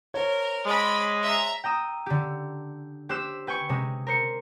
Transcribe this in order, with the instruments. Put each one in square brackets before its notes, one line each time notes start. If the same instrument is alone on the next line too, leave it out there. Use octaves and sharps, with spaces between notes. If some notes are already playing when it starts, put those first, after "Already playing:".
[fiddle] A#4 [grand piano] C5 C#5
[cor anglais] G#3 [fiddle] D5 B5
[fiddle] E5 A#5
[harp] G5 A#5 D#6 E6
D3 G4
G4 C5 E6 F#6 B6 E7
B4 G5 G#5 C#6
C3 G#3
A#4 C5 C#7